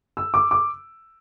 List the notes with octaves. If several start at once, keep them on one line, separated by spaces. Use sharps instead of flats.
E6
D6
D6